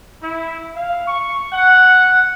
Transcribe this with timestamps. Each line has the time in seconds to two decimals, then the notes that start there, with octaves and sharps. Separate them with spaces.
0.22 E4
0.75 F5
1.07 C#6
1.53 F#5